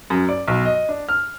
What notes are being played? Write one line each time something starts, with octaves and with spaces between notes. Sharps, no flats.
F#2
D5
B1
D#5
D4
F6